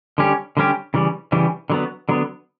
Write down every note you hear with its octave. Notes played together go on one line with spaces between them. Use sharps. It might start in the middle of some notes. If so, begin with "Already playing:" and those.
D3 G3 C#4 G4
D3 G3 C#4 G4
C#3 E3 G3
C#3 E3 G3
D3 F#3 B3
D3 F#3 B3